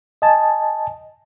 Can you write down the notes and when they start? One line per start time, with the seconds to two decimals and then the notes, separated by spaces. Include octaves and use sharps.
0.22 D#5 G#5 A5